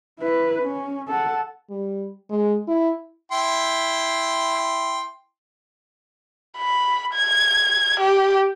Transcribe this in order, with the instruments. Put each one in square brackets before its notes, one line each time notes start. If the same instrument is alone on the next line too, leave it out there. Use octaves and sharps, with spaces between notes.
[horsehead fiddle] E4 B4
C#4
A4 F#5
[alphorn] G3
G#3
E4
[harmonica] E4 G5 C6
[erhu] B5
G#6
G4